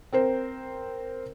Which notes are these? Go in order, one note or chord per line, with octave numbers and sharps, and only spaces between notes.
C4 A#4 C5